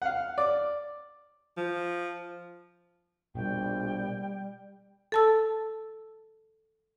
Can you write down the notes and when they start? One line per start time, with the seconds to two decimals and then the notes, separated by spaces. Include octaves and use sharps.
0.02 F5 F#5
0.38 D5
1.57 F3
3.35 A#1 B2 G3 G5
5.12 A4 A5 E6